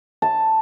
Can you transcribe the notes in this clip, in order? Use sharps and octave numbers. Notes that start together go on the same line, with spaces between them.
A5